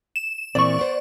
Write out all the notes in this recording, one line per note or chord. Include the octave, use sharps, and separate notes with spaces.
E7
A#2 E3 C4 D5 C#6
B3 C5